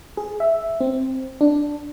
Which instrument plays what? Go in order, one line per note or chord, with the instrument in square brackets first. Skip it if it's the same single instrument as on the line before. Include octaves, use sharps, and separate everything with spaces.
[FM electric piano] G#4
E5
C4
D4